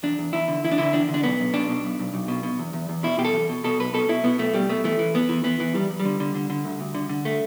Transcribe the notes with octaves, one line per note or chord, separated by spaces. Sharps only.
E2 D4
E2
E2 E4
D3
E2 E4
D4
D3 E4
E2 D4
D3
D4
B1 B3
B1
B2 D4
B2
B1
B1
B1
B2
B2
E2
E2
E2
B2 E4
B2 G4
A4
E2
B2
B2 A4
B1 B4
B2 A4
B2 E4
B2 B3
B1 A3
B2 G3
B2 A3
E3 A3
E3
E2 B3
E3
E3 B3
E3
E2 G3
E2
G3
D3
D3
D3
D3
D2
D2
D3
D3
A3